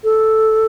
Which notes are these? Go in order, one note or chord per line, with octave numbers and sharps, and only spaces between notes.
A4